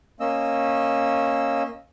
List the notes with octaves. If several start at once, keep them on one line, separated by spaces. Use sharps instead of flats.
A#3 C#4 D#5 E6